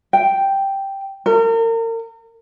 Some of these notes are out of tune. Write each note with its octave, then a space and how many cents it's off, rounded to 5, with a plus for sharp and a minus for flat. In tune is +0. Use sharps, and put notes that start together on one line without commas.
G5 +0
A#4 -35